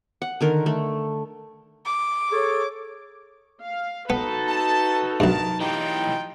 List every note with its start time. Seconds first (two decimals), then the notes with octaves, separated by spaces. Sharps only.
0.22 F#5
0.41 D3 D#3 A#4
0.66 A3
1.86 D6
2.32 G#4 A4 C#5
3.62 F5
4.10 B3 D#4 F#4 A4 B4
4.48 A5
5.20 B1 G2 D#3 A#4 A5
5.60 E3 D#4 F4 G4 G5